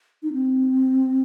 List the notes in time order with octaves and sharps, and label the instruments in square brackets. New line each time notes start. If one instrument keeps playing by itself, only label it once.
[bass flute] D#4
C4